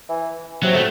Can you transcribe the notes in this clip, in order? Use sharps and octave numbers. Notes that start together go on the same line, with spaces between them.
E3
C3 F#3
A3